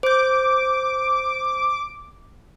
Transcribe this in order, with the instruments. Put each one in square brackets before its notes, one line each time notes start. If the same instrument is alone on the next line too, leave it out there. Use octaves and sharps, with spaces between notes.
[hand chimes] C5 G6 [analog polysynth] D6